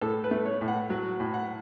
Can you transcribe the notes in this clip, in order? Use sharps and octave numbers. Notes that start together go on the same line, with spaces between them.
A2 A4
B4
A3
C#5
A2
F#5
F#3
A2
F#5